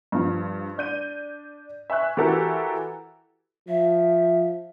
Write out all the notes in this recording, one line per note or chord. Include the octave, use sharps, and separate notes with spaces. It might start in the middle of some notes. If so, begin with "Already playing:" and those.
G2 F3
D4 G6 D#7
E5 G#5 C#6 F#6
E3 F#4 G4 A4 A#4
F3 E5